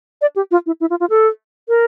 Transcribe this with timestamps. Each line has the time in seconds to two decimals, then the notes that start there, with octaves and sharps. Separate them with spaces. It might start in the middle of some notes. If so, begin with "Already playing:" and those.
0.21 D5
0.36 G4
0.51 F4
0.66 E4
0.81 E4
0.90 F4
1.00 F4
1.10 A4
1.68 A#4